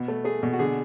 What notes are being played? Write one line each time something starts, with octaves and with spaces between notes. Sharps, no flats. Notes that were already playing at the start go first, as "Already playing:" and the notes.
Already playing: B2 B3
A3
A3 G#4
B2
F#4
D3 G#4